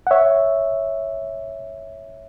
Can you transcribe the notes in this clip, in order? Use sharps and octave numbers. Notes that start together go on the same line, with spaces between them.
F#5
C#5 E5